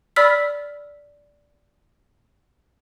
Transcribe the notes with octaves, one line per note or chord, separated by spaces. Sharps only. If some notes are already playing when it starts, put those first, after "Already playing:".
D5 B5 E6 F6 B6